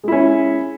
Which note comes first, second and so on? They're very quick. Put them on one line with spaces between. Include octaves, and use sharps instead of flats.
G#3 E4 C#4